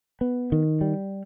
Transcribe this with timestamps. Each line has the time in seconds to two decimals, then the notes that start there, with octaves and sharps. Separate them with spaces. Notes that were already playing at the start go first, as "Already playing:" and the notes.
0.21 B3
0.52 D#3
0.81 G3